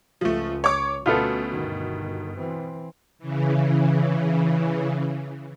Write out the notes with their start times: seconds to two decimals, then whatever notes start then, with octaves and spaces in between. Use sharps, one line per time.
0.21 C#2 F3 A3
0.64 C#5 D6
1.06 D2 B2 A3 B3 C#4 F4
1.52 G1 D#3
2.38 E3 C4
3.19 C#3 E3